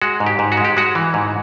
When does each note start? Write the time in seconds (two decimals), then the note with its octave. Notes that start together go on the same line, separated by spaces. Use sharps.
0.02 G#3 F#4
0.20 G#2
0.26 G4
0.39 G#2
0.52 F#4
0.57 G#3
0.65 G4
0.77 G#3 F#4
0.95 E3
1.14 G#2